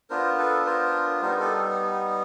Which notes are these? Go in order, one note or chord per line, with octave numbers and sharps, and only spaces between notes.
B3 D4 F4 A#4 C5
A4 B4
A#4 C5
G3 B3 D#4 A#4 C5
G4 A4